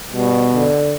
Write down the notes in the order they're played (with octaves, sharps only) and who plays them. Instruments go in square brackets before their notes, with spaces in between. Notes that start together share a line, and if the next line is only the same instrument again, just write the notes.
[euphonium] B2 [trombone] G3
[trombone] D3